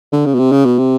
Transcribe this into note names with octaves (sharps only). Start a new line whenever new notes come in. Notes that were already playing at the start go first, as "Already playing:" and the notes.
D3
C#3
B2
C3
C#3
B2
C3